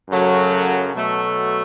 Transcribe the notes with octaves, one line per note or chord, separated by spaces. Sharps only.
F#2 C#3 F#3 A3
B2 F#3 A3